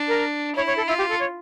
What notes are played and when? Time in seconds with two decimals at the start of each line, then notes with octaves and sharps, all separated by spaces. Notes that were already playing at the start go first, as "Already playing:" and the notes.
Already playing: D4
0.08 A#4
0.56 E4 C#5
0.67 C#5
0.77 A4
0.88 E4 F4
0.98 G4
1.09 A4
1.20 C#5